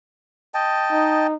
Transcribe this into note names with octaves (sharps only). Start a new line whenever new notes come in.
D#5 G5 A5
D#4